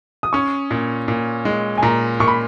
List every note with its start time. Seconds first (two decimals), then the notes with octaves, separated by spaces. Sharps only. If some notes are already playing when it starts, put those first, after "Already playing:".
0.23 D#6
0.33 C#4 C#6
0.71 A#2
1.08 A#2
1.45 G#3
1.77 G#5
1.82 A#2 A#5
2.20 A#2 C#6
2.28 B5